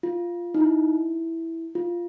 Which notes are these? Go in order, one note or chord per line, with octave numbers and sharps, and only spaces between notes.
F4
D#4
E4
F4